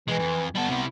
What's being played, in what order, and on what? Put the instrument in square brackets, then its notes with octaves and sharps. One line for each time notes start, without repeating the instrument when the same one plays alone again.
[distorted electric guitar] E2 G#3 [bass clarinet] E3
[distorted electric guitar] F2
[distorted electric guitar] G3 A4 [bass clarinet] B3
[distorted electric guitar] C3 E4